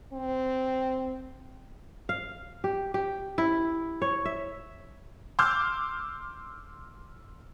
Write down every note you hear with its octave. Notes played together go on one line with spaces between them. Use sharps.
C4
F5
G4
G4
E4
C#5
E5
C6 D6 E6 F6 G6